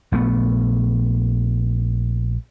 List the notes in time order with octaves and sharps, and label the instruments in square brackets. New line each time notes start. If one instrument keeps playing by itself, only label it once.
[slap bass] A#1 A3 B3